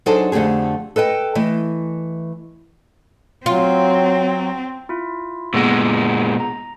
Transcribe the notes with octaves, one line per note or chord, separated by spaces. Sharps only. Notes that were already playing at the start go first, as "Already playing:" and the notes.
F#3 D4 D#4 G#4 A4 C5
F2 D3 A3 G4 G#4
A4 B4 D#5 G5
E3 A3 D#5
F#3 C4 F4
E4 F4
A#2 G#3 B3 D#5 F#5
A#5